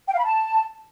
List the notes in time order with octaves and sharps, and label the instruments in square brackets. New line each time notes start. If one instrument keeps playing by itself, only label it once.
[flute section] G5
F5
B5
A5